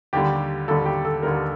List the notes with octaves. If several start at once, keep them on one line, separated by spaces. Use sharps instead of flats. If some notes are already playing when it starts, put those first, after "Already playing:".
D#2 D3 G3 G4
D#2 D3 G3 A4
G4
A4
D#2 D3 G3 A#4